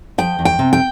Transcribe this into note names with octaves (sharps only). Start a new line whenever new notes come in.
F3 G5
E2
G5
C3
G5